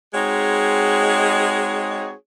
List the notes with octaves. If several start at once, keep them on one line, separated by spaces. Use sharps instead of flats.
G#3 C4 D#4 F#4 G#4 C#5